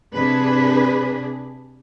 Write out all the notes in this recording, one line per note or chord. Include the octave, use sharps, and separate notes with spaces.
C3 D4 G#4 B4